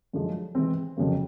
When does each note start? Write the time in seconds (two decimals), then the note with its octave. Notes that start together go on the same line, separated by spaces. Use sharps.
0.13 F#2 D3 F3 G#3
0.55 E3 G#3 C4
0.97 F2 C#3 F#3 A#3